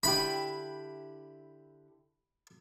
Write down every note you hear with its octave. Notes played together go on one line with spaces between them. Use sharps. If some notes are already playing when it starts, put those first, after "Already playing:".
D3 E4 G4 B5